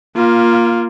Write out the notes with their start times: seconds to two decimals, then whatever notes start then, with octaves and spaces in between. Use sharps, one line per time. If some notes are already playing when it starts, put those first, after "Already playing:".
0.16 A#3 F4